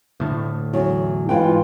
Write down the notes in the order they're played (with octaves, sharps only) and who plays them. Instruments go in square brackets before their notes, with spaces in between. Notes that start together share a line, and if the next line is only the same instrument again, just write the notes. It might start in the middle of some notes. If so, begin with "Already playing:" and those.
[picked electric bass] D2 A2 A3
[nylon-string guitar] E2 F#3
[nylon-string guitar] G#2 E3 G5 [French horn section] F4